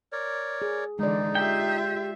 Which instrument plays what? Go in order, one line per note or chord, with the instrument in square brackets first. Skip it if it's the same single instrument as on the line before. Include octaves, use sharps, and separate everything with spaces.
[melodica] A#4 C#5 D5
[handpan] G#4
[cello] D3 E3 [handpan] G#3 D5 [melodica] D#4
[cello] F4 E5 [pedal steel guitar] G4 G5